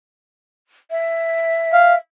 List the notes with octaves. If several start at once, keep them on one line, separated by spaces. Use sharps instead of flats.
E5
F5